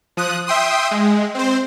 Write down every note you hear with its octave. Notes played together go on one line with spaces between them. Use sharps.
F3 D#6 F#6
E5 G5 C6 D#6
G#3
C4 C5